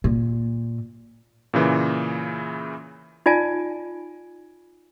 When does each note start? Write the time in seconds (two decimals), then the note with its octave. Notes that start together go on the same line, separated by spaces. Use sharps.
0.04 A#2
1.54 A#2 C#3 E3
3.26 D#4 F4 D5 G#5 A5